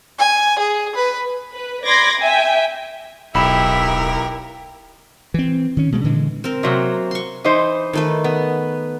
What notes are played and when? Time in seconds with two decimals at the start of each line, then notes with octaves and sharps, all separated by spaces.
0.18 G#5
0.58 G#4
0.95 B4
1.53 B4
1.85 D5 B5 C6 D6 G#6 A#6
2.18 E5 G5 G#5
3.35 D1 B1 E4 G4 A#4 E5 B5 E7
5.34 E3 C4
5.77 D#3 C#4
5.92 B2 G#3 A3 B3
6.04 A#2 D3 E3 G#3
6.44 C4 A#4
6.63 C3 F#3 A#3
7.11 C6 C#6
7.44 E3 D#4 C5
7.93 D#3 A3 B4
8.24 B3